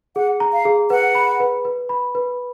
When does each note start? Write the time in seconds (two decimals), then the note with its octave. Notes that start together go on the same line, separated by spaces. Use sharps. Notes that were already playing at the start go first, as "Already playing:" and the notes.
0.16 G#4 F#5
0.40 A#5
0.53 F5
0.65 G#4
0.90 B4 F#5
1.15 B5
1.40 B4
1.65 B4
1.89 B5
2.15 B4